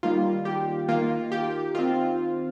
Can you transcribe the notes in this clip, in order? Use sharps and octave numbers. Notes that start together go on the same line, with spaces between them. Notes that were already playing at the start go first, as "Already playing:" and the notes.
D#3 G3 A#3 F4
G4
D#3 A#3 F4
G4
D#3 C4 F4